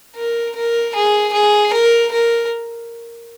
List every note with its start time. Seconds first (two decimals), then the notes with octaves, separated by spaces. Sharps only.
0.16 A#4
0.56 A#4
0.95 G#4
1.33 G#4
1.73 A#4
2.12 A#4